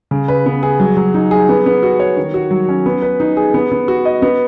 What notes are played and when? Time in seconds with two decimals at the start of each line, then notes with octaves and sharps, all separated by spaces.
0.11 C#3
0.28 B4
0.46 B3
0.63 G#4
0.80 F#3
0.97 F#3
1.14 D#4
1.31 G#4
1.49 B3
1.66 B3
1.83 F#4
2.00 C#5
2.17 D#3
2.34 F#4
2.51 F#3
2.69 C#4
2.86 B3
3.02 B4
3.20 D#4
3.37 G#4
3.54 B3
3.72 B3
3.88 F#4
4.05 D#5
4.22 B3